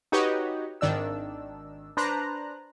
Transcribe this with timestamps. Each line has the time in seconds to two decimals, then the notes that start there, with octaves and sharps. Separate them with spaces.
0.12 D#4 F#4 G4 B4 C#5 D#5
0.81 G#1 D#3 D4 E6
1.97 D4 B4 C5 A#5 F#6